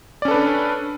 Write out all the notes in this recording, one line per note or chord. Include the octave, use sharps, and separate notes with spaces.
C#4 D4 A4 B4 D5